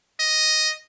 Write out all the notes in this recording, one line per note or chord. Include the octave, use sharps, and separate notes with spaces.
D#5